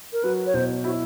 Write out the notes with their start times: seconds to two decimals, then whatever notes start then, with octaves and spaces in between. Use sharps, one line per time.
0.13 A#4
0.23 F#3 B4
0.46 C#5
0.54 B2 C5
0.84 E4 F#4